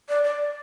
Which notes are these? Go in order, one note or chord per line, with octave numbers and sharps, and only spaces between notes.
D5
D5